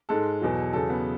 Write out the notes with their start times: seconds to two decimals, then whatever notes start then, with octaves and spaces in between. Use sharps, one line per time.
0.09 G#2 G#3 A4
0.42 E2 B2 F#3
0.73 E2 C#3 F#3 A4
0.90 B3